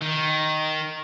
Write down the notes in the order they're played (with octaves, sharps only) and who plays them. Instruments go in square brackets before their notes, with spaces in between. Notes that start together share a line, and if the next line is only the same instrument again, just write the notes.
[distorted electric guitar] D#3